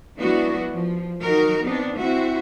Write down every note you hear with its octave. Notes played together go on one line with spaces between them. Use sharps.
F#3 G#3 B3 D4 E4 F#4
F3
D#3 F#3 D#4 F#4 A#4
B3 C4 D4 D#4
C4 E4 F#4 E5